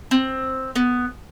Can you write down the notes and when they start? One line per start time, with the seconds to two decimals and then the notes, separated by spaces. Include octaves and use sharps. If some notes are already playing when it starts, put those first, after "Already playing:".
0.11 C4
0.76 B3